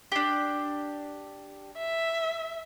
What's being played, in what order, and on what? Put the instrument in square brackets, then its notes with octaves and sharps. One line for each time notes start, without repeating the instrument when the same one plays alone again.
[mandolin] D4 G4
[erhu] E5